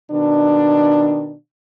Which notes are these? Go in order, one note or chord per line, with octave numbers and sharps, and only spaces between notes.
B2 D#3 D4